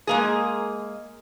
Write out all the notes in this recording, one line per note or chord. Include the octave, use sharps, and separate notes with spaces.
G#3 A#3 G#4